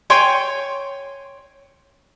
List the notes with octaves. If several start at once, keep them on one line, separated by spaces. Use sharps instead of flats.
C#5 G5 G#5 C6